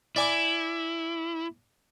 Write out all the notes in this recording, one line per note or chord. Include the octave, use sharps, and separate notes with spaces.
E4 D5 G#5 D6